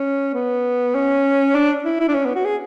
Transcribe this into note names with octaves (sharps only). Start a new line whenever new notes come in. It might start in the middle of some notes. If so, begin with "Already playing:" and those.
Already playing: C#4
B3
C#4
D4
E4
E4
D4
C#4
B3
F#4
G#4